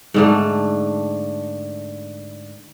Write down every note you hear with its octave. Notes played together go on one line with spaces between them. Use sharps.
G#2 D3 A3